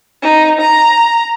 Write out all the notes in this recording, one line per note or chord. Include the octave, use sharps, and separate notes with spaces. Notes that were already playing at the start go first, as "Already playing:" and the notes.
D#4
A#5